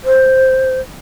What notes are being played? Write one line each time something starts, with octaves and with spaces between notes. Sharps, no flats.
C5